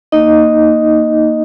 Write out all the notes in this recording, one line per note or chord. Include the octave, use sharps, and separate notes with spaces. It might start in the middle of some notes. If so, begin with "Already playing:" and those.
A#3 D#4 D#5